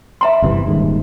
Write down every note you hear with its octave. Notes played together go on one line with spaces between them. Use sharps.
E5 A#5 C6
G1 C3 E3
D#1 D#2 G#2